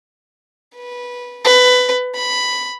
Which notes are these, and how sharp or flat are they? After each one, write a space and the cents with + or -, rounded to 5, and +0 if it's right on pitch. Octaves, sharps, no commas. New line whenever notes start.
B4 -15
B4 +15
B5 +5